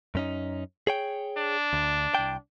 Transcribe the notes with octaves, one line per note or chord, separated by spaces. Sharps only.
F#2 C#4 D#4
G#4 C#5 G5
D4
D2
C2 G5